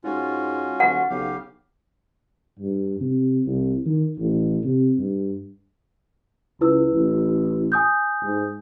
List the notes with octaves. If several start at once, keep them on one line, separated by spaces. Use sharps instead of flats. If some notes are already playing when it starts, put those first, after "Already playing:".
G#2 C#4 F4 F#4
D#1 F#5
B1 C#3 G4 F5
G2
C3
C2
D#3
A1
C3
G2
C#2 E4 B4 E6
A1
G#5 D#6 G6
G#2